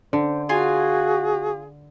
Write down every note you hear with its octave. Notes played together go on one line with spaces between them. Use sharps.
D3 C5
F4 F#4 G#4 G#5